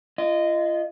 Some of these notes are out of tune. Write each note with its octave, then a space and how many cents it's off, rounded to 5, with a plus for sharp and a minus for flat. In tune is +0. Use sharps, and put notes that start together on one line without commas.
F4 -35 D#5 -10